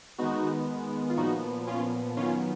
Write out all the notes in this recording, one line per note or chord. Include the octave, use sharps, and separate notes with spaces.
D#3 G#3 B3 D#4 F#4
F4
A#2 F3 B3 D#4 F#4
C#4 F4
D#3 F#3 B3 C#4 F4